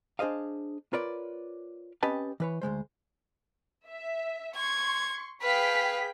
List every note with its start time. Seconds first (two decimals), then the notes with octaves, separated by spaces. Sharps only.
0.19 D4 G#4 C5 D#5 F5
0.93 F4 A#4 B4 C#5 D5
2.03 C4 C#4 G4 B4 D#5 A5
2.40 E3 B4 C#5
2.62 D2 A#2 G#3 C5
3.88 E5
4.56 C6 C#6 G#6
5.42 G#4 B4 F5 G5 B6